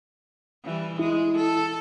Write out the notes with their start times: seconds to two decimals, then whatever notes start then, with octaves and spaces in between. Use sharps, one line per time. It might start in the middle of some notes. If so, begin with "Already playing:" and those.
0.64 E3 G3
0.99 G#3 E4
1.37 A4